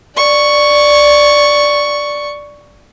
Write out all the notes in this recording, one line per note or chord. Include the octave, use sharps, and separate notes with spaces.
D5 C#6